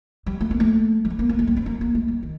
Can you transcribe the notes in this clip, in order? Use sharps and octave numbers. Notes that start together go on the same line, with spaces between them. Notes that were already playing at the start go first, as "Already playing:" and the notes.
G3
A3
A#3
A3
G3
A3
A#3
A#3
A3
G3
C4
A#3
A#3
A3
G3
D#3